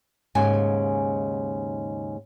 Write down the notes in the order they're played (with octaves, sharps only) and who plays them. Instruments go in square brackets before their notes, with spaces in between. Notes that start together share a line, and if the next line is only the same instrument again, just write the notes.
[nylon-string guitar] D#2 G#2 C#3 G#5